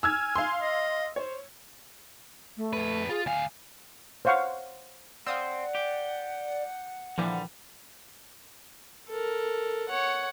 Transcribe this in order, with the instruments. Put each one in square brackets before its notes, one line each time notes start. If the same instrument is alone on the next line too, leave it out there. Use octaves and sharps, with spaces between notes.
[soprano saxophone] G#5 [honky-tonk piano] E6 F6 G#6
[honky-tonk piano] F5 C6
[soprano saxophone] D#5
[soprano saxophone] C5 [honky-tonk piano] C#5
[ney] A3
[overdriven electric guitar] F2 B4
[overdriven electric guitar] F4 [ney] G#4
[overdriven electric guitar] D2 F5 [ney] G#5
[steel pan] C5 C#5 F5 F#5 C#6
[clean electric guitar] C4 [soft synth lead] D5 [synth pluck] F5 D#6 E6 [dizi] F#5
[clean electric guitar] G4
[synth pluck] A#2 E3 F3 [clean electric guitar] D3 G3
[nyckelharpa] A4 A#4
C#5 F#5